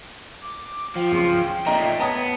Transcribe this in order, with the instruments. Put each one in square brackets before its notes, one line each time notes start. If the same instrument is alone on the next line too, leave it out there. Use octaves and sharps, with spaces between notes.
[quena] D6
[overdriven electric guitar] F3 [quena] G5
[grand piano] C#2
[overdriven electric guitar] A#2 A3 [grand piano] D#4 A#5
[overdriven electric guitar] B3 [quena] C#5 [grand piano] A5 A#5 D#6